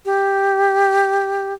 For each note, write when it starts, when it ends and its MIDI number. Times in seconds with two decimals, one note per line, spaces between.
0.05 1.54 67